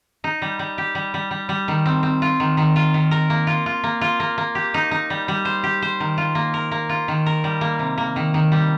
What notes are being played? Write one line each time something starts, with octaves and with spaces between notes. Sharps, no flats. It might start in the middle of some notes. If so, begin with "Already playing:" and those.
D#4
G3
G3
G4
G3
G3
G3
G3
D#3
C4
C4
F4
D#3
D#3
F4
D#3
A#4
A#3
F4
F4
A#3
F4
A#3
A#3
G4
D#4
D#4
G3
G3
C5
G4
C5
D#3
F4
A#3
A#4
A#3
F4
D#3
A#4
G3
A#3
C3
A#3
D#3
D#3
G3